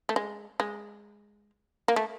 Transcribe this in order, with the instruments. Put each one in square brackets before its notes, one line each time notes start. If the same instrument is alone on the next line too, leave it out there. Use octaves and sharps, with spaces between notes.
[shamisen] A3
G#3
G#3
A#3
A3